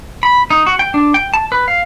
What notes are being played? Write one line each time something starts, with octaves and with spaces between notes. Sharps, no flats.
B5
D#4
F#4
G5
D4
G5
A5
B4
F5